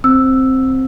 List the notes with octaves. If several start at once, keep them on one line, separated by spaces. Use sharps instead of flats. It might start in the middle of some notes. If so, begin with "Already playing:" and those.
C4 E6